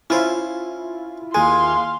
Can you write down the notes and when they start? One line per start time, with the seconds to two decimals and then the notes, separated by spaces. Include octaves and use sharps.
0.10 C#4 E4 F4 C5
1.35 D#2 G#3 F5 G#5 C6